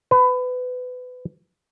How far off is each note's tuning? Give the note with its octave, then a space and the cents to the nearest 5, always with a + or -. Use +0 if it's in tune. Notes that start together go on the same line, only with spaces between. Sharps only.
B4 +25